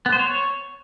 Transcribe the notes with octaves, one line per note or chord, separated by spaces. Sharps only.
B3
C5
C#5